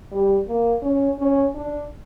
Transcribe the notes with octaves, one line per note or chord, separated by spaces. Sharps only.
G3
A#3
C#4
C#4
D4